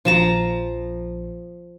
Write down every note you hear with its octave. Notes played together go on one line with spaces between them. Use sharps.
A#1 F3 A5 A#5